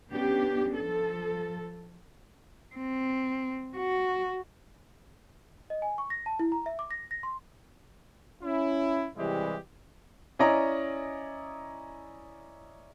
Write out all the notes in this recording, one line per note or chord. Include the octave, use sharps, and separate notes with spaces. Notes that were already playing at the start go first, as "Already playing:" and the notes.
B3 C#4 D4 G4
F3 A4
C4
F#4
D#5
G#5
C#6
A#6
A5
E4
A#5
E5
D6
A#6
A#6
C6
C#4 E4
C3 E3 G3 G#3 E4 G4
C#4 E4 D5 D#5 G#5 A#5